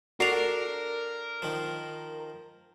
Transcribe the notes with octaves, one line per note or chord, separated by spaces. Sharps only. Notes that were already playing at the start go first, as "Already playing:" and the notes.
D4 F#4 A4 A#4 D5 C7 F7
D#3 F3